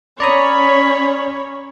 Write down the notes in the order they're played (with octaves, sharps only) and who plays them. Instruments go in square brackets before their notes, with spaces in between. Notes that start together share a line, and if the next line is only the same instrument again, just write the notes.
[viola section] C#4 C#5 [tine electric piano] D5 A#5 D#6 [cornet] B5